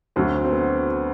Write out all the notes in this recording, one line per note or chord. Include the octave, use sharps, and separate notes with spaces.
D2 D3 F#3 C4
C4
B3